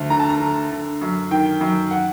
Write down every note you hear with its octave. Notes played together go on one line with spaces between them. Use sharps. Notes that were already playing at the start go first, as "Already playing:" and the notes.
Already playing: D2
D3 A#5
A5
A#5
D3
D3
F#2
D#3 G5
F#2
F#5